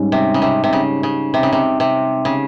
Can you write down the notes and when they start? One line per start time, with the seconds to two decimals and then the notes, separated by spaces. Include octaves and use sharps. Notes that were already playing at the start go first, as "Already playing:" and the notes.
Already playing: G#2 G3 C#4 G4
0.12 C3
0.34 C#3
0.42 C3
0.64 C3
0.73 C#3
1.03 C#3
1.34 C3
1.43 C#3
1.53 C3
1.80 C3
2.25 C#3